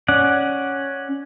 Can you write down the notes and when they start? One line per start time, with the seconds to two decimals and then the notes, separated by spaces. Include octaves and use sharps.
0.08 C#4 D5 F#5